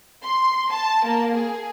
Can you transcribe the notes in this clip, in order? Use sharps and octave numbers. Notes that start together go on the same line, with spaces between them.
C6
A5
A#3
G#4